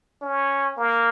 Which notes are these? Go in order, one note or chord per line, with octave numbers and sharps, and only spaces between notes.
C#4
A#3